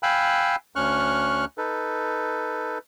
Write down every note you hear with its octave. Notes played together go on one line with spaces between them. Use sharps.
F5 G5 G#5 B5 E6 F#6
D2 C#4 C#6 F6 F#6
D#4 A4 B4